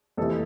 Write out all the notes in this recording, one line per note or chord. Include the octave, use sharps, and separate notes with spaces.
F2 C3 E3 A4